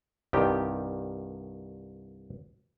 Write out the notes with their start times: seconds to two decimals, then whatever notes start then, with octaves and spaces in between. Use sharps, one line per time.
0.33 C2 G2 D#3 G4